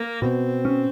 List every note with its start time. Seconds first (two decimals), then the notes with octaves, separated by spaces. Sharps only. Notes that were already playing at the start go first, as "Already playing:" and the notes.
Already playing: A#3
0.22 B2 C4
0.65 C#4